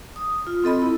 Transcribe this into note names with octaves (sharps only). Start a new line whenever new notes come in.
D#6
F4
C4 A4 D#5 B5
E4